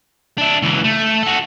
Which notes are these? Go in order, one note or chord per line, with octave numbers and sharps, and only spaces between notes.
D4 E4
C#2 E3
A3
F#4 A4